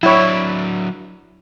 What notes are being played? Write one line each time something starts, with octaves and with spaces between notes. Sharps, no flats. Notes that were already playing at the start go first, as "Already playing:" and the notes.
F#3 D4 E4 C#5